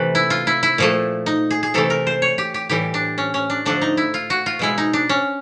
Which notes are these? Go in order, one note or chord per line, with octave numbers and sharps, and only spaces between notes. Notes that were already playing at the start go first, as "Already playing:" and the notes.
Already playing: C3 E3 A3 B4
E4
F4
E4
E4
A#2 F3 A3
D#4
G#4
G#4
C3 E3 A3 A4
A#4
C5
C#5
G4
G4
A2 E3 G3 G4
D4
C#4
C#4
D4
D3 F3 A3 D4
D#4
E4
F4
F#4
F4
B2 G#3 E4
D#4
D4
C#4